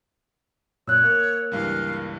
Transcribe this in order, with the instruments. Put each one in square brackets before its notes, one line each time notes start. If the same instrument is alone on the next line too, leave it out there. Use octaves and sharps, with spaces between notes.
[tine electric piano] F#2 A#2 [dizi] C#5 [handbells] E6 F#6
[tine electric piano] A#3
[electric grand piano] C#2 G2 E3 [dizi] F5